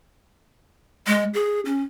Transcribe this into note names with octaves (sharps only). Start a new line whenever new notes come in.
G#3
G#4
C#4